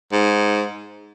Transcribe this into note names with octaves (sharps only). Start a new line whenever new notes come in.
G#2